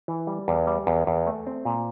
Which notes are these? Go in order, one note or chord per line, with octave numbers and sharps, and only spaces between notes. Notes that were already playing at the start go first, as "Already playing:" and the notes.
E3
G3
E2
G3
E2
E2
A3
C4
A#2